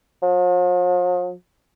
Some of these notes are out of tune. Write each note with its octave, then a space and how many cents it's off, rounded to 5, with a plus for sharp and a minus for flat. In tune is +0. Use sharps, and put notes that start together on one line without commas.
F3 +45